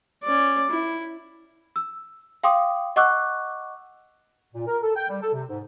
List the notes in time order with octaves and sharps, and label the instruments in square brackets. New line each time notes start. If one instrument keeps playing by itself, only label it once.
[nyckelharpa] C#4 D5
E4
[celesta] E6
F5 G5 C6 D6 D#6
D#5 F#5 C#6 D6 E6 F#6
[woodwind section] A#2
A#4
A4
G5
G3
A4
C3
G#2